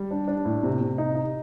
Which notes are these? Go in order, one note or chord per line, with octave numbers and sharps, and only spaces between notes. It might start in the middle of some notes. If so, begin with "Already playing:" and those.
Already playing: G3
D4
D4
A2
C3
C3
D#4
D#4